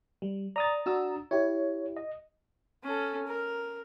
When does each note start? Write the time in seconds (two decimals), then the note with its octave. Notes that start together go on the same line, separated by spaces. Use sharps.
0.22 G3
0.56 D5 A#5 D#6 A6
0.86 D4 F#4 E6
1.31 E4 G4 C#5
1.97 D#5
2.84 C#4 A4
3.27 A#4